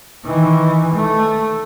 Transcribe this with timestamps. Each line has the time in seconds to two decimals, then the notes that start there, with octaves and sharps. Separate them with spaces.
0.25 D#3 E3
0.94 A3